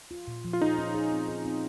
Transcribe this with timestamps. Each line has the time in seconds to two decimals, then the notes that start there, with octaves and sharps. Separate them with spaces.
0.11 F4
0.27 A#2
0.45 F3
0.53 F4
0.61 D#4 G#4
0.78 C#4
0.95 G#4
1.11 C4
1.28 G#4
1.45 C4